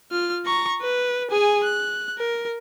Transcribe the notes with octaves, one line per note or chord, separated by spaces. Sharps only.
F4 F6
A#5 C#6
B4
G#4 G#5
F#6
A#4